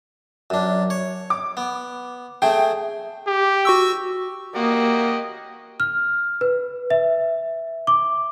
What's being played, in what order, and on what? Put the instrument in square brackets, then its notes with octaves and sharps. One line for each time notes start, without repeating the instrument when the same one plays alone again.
[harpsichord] F#2 D4
C#5
[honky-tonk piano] D6
[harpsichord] B3
[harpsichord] A3 C4 G#4 [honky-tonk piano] G5
[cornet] G4
[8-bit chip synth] F#4 C#6 E6
[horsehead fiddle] A#3 [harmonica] F#4 G4 D#5
[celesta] F6
B4
E5
D6